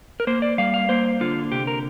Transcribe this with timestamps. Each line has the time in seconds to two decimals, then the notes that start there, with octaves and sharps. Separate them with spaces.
0.20 A#4
0.27 A#3 C5
0.42 D5
0.58 G3 F5
0.74 F5
0.89 A#3 C5
1.21 D3 F4
1.52 C3 G4
1.67 A#4